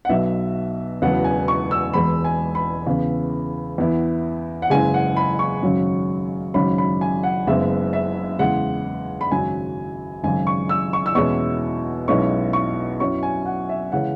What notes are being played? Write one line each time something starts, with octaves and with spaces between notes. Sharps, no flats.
F#5
B1 B2 F#3 B3 E5
E1 E2 C#3 F#3 B3 F#5
G#5
C#6
E6
E1 E2 E3 G#3 B5
G#5
B5
E2 C#3 E3 B3
E2 E3 B3 E4
F#5
F#1 F#2 C#3 E3 G#3 G#5
F#5
B5
C#6
G#1 F#2 C#3 F#3 C#4
G#1 F#2 C#3 F#3 C#4 B5
B5
G#5
F#5
F#1 F#2 C#3 G#3 B3 E5
E5
E2 C#3 G#3 F#5
B5
G#1 F#2 C#3 F#3 G#5
G#1 F#2 C#3 G#5
C#6
E6
C#6
E6
E2 B2 G#3 C#4 E4 C#6
B1 B2 G#3 C#4 E4 C#6
C#6
F#2 F#3 C#4 E4 C#6
G#5
F#5
E5
C#3 E3 G#3 C#4 F#5